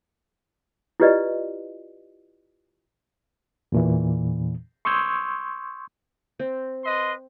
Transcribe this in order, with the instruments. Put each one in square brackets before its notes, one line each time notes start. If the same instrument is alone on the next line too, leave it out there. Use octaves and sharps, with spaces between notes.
[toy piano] E4 F4 G4 B4 D5 D#5
[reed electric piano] E2 A#2 E3
C6 C#6 D#6 E6 G6 G#6
[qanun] C4
[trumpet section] B4 D#5 C6